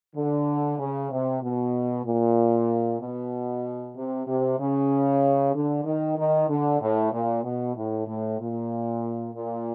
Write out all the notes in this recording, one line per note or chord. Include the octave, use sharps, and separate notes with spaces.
D3
C#3
C3
B2
A#2
B2
C3
C3
C#3
D3
D#3
D#3
D3
A2
A#2
B2
A2
A2
A#2
A#2